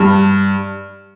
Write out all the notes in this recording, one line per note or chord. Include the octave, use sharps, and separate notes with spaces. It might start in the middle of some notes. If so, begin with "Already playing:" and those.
Already playing: G2